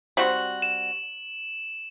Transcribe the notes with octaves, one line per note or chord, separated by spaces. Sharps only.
G3 C4 F#4 F#7
E7